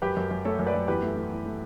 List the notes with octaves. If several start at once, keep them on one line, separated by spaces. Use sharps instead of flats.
F#2 G4 B4
F#2
F#2
A3 A4 C#5
F#2
B4 D5
F#2
E2 G4 B4
A3
A3
E2
A3